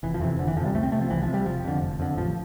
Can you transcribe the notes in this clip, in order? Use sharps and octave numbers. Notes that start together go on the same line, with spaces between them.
F1 E3
F3
F2 C3 E3
F1 D3
E3
F2 C3 F3
G3
C2 A3
C4
C3 A3
F3
C2 E3
F3
C3
G3
F1 F3
F2 D3
F1
F2 D3
A1 F3